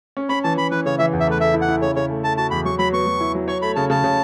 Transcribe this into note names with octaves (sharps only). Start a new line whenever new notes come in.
C#4
C#4 B5
E3 A5
E3 B5
E3 B4
C#3 C#5
E3 E5
E2
E5
A3 B4
A3 E5
E4
F#5
E4
C#3 C#5
C#3 C#5
A3
A3 A5
F#4 A5
E2 B5
F#3 C#6
F#3 B5
B3 C#6
F#3
E4
F#3
C#5 C#6
A3 B5
C#3 A5
C#3 A5
C#3